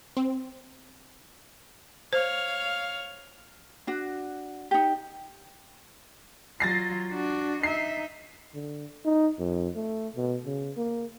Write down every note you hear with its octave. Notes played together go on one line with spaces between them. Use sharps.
C4
C5 C#5 F5
D4 F#4
D#4 G4
F#3 F4 A6 A#6 C7
D4 F#4
D#4 E5 C7
D3
D#4
F2
A3
B2
C#3
A#3